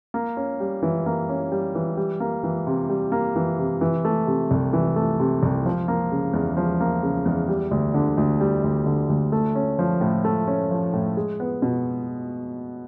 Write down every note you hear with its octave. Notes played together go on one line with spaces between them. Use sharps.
A#3
C#4
G3
E3
A#3
C#4
G3
E3
G3
A#3
E3
C3
G3
A#3
E3
C3
E3
A3
C3
C2
E3
A3
C3
C2
F3
A#3
C#3
E2
F3
A#3
C#3
E2
G3
D2
D3
D2
G3
D2
D3
D2
A3
C#4
F3
A2
A3
C#4
F3
A2
G#3
B3
B2